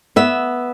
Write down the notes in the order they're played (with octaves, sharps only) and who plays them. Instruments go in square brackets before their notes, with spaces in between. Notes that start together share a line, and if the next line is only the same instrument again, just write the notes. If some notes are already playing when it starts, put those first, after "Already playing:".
[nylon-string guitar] B3 E5